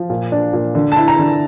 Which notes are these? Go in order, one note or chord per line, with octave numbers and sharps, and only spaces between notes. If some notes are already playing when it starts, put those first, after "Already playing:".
Already playing: F3
A#2
D4
A#2
D3
A5
E4
A#5
D3